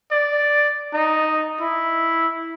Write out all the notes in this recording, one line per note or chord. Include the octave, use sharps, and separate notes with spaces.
D5
D#4
E4